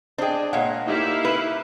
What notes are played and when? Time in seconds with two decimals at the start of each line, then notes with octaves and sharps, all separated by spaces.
0.18 D4 G#4 C5 D#5 G5
0.53 A#2 G#3 C#5 F5 F#5
0.86 A#3 D#4 E4 G4 E5 F5
1.25 B4